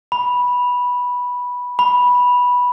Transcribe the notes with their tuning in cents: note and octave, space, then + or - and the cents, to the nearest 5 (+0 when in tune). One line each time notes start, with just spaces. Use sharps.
B5 -10
B5 -10